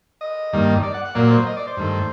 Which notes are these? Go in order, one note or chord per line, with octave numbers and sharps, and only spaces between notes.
D#5
G2 D#3 G3 A#3
D5
F#5
F#5
A#2 F#3 A#3 D5
C5
D#5
D5
C5
G2 D#3 A3